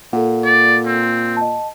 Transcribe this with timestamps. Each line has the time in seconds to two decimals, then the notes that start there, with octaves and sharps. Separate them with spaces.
0.13 A#2 A4 F#5
0.45 D5
0.86 C4
1.37 D#5 A5